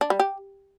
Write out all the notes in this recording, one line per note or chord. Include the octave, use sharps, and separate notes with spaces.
D4
G3
G4